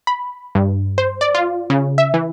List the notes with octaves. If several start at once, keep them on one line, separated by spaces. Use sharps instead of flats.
B5
G2
C5
D5
F4
C#3
E5
E3